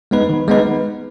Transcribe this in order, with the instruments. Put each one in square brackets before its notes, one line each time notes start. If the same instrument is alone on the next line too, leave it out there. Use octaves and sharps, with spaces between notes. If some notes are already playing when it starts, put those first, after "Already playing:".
[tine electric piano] G#3 B3 D#4 B4
D#3
G#3 B3 D#4 B4